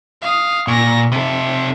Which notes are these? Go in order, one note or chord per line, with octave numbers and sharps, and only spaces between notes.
F5 D#6
A#2 C#6 A#6
C3 A4 E5